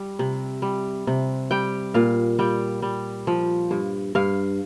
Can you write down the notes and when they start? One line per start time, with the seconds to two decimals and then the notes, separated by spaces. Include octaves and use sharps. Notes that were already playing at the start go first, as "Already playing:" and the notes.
Already playing: G3
0.19 C3
0.62 G3
1.07 C3
1.51 G3 G5
1.94 A#2 F5
2.39 G3 G5
2.82 G3
3.27 F3
3.71 G2
4.15 G2 F5